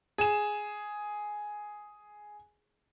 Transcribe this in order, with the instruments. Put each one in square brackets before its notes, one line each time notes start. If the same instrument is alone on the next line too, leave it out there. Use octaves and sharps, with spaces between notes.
[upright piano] G#4 E7